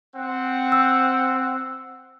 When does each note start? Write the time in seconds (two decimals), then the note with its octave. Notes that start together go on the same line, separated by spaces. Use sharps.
0.15 C4 F#5
0.72 E6